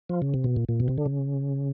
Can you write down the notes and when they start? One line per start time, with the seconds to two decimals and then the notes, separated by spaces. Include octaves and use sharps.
0.09 F3
0.22 C#3
0.34 C3
0.44 B2
0.56 A#2
0.69 A#2
0.80 B2
0.88 C3
0.98 D3
1.06 C#3